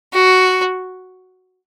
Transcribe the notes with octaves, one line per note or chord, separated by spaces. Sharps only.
F#4